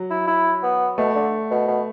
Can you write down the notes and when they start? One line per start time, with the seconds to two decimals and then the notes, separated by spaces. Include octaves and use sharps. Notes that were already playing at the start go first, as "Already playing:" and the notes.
Already playing: F#3
0.10 E4
0.27 E4
0.63 B3
0.98 B2 A3
1.15 D3
1.51 B2
1.68 B2